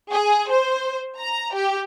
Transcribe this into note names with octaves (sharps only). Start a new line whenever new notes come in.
G#4
C5
A#5
G4